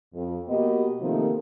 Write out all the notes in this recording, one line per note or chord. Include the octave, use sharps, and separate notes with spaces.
F2
B2 A#3 B3 G4 D#5
C3 D#3 F3 A3 A#3